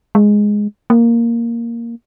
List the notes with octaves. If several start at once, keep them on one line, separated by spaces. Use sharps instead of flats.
G#3
A#3